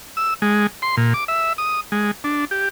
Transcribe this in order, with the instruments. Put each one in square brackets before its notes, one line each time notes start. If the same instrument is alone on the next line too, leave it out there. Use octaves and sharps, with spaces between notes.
[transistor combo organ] E6
G#3
C6
A#2
D6
E5
D#6
G#3
D4
G4